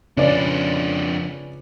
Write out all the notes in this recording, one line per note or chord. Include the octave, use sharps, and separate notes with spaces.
F2 C#3 C#4 D4 F4 B4 D5